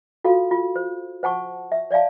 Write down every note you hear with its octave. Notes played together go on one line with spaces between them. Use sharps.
F4 F#4 A4 F5
F4
C5
C5 F#5 A5 C#6
E5
C#5 D5 E5 F5 A5